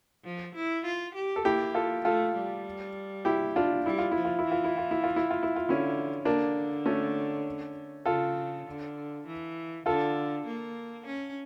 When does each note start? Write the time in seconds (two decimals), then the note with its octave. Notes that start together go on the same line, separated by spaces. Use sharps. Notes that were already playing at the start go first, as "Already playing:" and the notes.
0.24 F3
0.55 E4
0.85 F4
1.15 G4
1.36 A4
1.45 A#3 E4 G4
1.75 F4 A4
2.05 A3 F4 A4
2.36 G3
3.25 E4 G4
3.56 D4 F4
3.85 G3 E4
3.99 F4
4.11 F3 E4
4.25 F4
4.39 E4
4.46 E3
4.52 F4
4.64 E4
4.78 F4
4.91 E4
5.04 F4
5.16 E4
5.31 F4
5.43 E4
5.56 F4
5.66 D3 C#4 E4
6.25 D3 A#3 D4
6.86 A3 C#4
8.05 C#3 F4 A4
8.67 D3
9.26 E3
9.86 D3 F4 A4
10.46 A#3
11.06 C#4